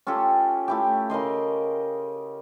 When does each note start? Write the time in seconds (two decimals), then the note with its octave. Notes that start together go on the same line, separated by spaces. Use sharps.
0.07 C#4 F4 G4 A4
0.68 A3 E4 G4
1.10 C#3 A#4 D#5 C6